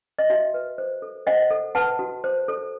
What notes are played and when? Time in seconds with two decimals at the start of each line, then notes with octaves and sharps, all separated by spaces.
0.19 D#5
0.30 F#4 E5
0.54 B4
0.78 C5
1.02 A4
1.27 C5 D#5 F#5
1.51 A4
1.75 B4 F#5 A5
1.99 F#4
2.24 C5
2.48 A4